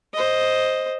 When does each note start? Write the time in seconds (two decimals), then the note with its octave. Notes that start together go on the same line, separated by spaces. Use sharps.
0.14 C5 D#5